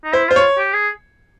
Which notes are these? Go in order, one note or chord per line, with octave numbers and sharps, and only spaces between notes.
D#4
E4 C5
F4 C5
C#5
G4
G#4